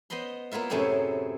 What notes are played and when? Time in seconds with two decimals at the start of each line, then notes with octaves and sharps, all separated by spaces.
0.10 B3 C5 D#5 B5 C6
0.51 A#3 B3 E4 F4 E5
0.69 F#2 A2 C3 G#4 C#5 B5